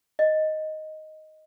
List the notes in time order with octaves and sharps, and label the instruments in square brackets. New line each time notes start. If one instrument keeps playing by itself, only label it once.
[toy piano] D#5